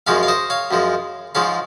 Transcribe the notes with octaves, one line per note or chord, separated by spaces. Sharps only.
F#2 F3 G#3 C#5 F5
F5
C5 D#5
C#5 F5
F#2 F3 G#3
G#2 F3 G#3 C#5 F5